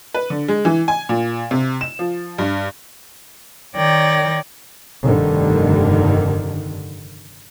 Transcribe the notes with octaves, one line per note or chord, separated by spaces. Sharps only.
B4
D3
G#3
E3
G#5
A#2
C3
E7
F3
G2
D#3 C#5 D5 G5 A#6
F1 G2 D3 D#3